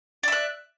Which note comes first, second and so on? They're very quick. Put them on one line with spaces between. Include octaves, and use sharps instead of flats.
D5 E5 F#6